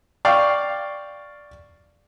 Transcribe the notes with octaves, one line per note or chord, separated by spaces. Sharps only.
D5 F5 G5 C#6